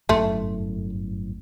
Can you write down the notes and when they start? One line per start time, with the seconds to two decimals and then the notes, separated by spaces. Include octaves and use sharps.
0.09 G1 F#2 A2 A3